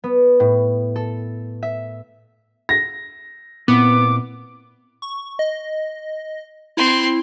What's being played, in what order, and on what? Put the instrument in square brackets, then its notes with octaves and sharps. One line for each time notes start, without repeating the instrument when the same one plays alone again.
[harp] B3
A2
A4
E5
[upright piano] A#6
[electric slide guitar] A#2 C4 E4 [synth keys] B3 [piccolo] D6
[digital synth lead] C#6
D#5
[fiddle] C4 C6 [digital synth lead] E4